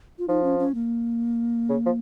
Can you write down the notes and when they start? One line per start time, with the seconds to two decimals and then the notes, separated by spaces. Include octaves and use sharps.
0.19 F4
0.28 F3 D#4
0.43 C#4
0.59 C#4
0.75 A#3
1.69 C#3
1.86 F3